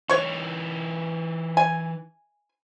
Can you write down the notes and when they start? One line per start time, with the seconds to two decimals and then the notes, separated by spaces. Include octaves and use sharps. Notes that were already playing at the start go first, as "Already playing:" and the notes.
0.09 E3 D#4 C#5 C#6
1.57 G#5